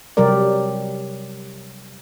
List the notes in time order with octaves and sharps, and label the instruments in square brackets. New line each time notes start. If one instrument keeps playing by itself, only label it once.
[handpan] C3 F#3 G3 G4 A#4 D5